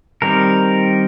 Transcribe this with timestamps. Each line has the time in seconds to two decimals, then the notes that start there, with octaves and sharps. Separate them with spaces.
0.22 D#3 G3 C4 A#4